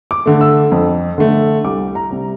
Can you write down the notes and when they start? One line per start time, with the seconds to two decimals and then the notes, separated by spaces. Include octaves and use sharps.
0.11 D6
0.26 D3 A3
0.41 E6
0.72 F2
1.18 D3 A3
1.64 C2 D6
1.95 A#5
2.11 C3 G3